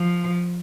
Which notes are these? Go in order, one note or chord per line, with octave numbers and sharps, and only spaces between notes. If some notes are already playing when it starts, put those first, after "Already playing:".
Already playing: F3